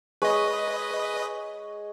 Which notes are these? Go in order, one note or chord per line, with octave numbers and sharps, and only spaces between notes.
G#3 B4 C#5 D#5